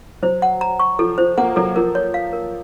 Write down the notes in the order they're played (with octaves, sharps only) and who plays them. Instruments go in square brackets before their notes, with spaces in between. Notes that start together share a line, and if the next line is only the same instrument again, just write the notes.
[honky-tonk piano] F#3 [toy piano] C5
[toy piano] F#5
A#5
C#6
[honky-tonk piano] F3 [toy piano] A4
[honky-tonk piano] F3 [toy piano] C5
[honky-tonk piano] A#3 [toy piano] F#5
[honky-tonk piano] F#3 [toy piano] A4
[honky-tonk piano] F3 [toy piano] A#4
[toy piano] C#5
F5
A#4